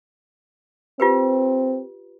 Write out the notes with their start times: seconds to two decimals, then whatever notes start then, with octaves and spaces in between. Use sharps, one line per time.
1.00 C4 F4 G4 B4